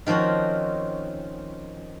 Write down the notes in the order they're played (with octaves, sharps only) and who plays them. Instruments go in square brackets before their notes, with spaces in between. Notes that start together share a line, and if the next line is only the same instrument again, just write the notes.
[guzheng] D#3 F3 C4 C#4 F#4